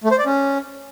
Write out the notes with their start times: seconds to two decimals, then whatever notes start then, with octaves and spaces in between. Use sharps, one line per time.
0.04 A3
0.11 C5
0.18 D5
0.26 C#4